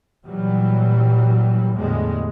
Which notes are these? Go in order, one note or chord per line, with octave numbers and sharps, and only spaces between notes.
A#2 E3 F#3 G3
E2 A2 D3 G3 G#3